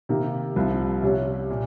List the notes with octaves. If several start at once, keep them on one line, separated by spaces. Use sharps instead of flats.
C3 D#3 A#3
C2 C3 F3
C3 G3 C#4
A#2